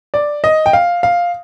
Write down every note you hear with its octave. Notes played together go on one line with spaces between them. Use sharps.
D5
D#5
G5
F5
F5